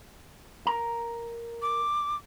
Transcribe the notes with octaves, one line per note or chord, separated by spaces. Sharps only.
A#4 A#5
D6